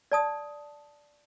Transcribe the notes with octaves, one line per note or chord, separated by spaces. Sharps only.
D5 A5 D#6